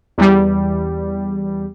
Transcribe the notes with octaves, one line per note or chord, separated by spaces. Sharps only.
E2 G3